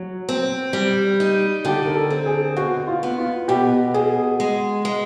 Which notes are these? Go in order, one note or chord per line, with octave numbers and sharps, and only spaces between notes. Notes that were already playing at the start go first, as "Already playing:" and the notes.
Already playing: F#3
C4
G3
D#4
D3 G4
A#4
A4
C4
G#4
B2 F#4
F4
B3
F4
B2 G4
B2 G#4
G#3
G#3